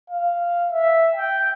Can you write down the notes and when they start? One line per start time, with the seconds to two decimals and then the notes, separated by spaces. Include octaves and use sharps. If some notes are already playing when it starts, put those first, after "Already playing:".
0.10 F5
0.72 E5
1.15 G5